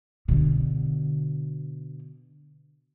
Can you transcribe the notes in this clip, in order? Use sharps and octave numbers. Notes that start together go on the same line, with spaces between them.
B2 D3